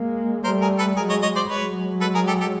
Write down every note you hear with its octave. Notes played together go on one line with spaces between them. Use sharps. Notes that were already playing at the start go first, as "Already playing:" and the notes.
Already playing: G#3 A#3
G3 A3 A#4 C5
G#4 A#4
A4 B4
F#3 G#3 G#4 A#4
C#5 D#5
C#5 D#5
C5 D5
F#3 G#3 B4 C#5
A4 B4
G#4 A#4
G4 A4
G4 A4